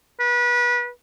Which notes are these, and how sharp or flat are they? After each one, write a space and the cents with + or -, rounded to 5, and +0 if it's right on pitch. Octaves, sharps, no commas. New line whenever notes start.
B4 -30